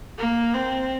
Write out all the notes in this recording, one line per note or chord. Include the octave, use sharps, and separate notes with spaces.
A#3
C4